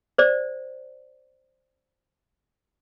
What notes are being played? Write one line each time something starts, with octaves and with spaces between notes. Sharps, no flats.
C5 D5